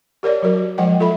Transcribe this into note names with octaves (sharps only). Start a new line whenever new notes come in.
G4 A#4 C#5 D5
F#3 F#4 A#4
F3 G#3 D#5 F#5 G5
F4 A4 E5 B5